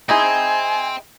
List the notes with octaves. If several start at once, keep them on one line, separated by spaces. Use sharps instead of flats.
D#4 E4 G#4 G5 G#5 C6